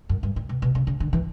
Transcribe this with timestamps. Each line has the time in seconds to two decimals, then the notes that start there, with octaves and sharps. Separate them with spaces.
0.09 F#2
0.23 G2
0.36 A2
0.49 B2
0.62 B2
0.75 C#3
0.87 C#3
1.00 D3
1.13 E3